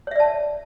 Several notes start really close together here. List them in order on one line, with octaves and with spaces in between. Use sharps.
C#5 E5 D5 A5